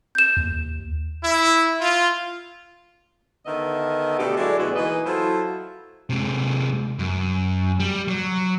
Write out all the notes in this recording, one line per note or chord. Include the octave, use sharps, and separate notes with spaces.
G6 E7
D#2
E4
F4
D3 D#3 B3 A#4 D#5 E5
B2 D3 A3 D4 G4 A4
F#3 G#3 D4 E4 A4 D5
D2 B2 G#3 B3 E4 F#4
E3 A#3 D#4 G#4 B4 D#5
F#3 E4 F4 A4 C5
C3 G#3
F#2
G3
F#3